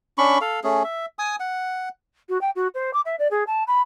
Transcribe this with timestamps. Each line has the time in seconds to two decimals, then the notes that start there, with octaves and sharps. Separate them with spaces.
0.18 C#4 D4 B5 C#6
0.41 A4 F5
0.64 A3 C#4 G#4
0.84 E5
1.19 G#5 D#6
1.40 F#5
2.29 F#4
2.41 G5
2.55 F#4
2.74 C5
2.93 D6
3.05 E5
3.19 D5
3.31 G#4
3.47 A5
3.67 B5